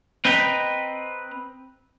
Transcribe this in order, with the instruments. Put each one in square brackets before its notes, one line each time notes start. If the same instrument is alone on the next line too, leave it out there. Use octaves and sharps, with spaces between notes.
[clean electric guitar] C4 B4 D#5 G5 A#5 B5